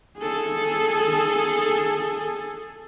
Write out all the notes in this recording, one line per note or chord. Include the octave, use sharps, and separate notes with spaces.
G#4 A4